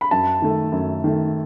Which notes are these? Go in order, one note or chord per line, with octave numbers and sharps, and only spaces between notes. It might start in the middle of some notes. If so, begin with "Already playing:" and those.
B5
F#2 A5
D#3 A3
F#2
D#3 A3